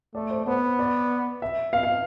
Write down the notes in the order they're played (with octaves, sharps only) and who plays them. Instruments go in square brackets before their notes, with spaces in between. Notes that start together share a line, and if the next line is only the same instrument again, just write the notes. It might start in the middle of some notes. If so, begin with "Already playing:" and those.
[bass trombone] A3 [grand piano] D5
[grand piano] C5
[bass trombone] B3 [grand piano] C5
[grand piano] D5
E5
F5
F5